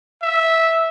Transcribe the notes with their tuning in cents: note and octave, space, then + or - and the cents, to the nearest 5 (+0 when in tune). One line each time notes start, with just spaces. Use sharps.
E5 -10